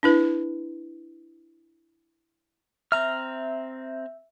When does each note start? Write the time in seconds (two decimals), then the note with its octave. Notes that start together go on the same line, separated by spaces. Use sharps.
0.03 D4 E4 B4
2.92 C4 E5 A#5 F6